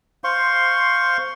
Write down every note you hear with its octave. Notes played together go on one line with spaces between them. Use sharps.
C5 F5 C6 C#6